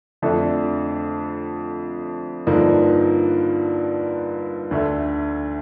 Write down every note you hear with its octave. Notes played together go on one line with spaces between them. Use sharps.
F2 D3 A3 D4 A4
G2 D3 F3 A#3 D#4
D2 D3 A3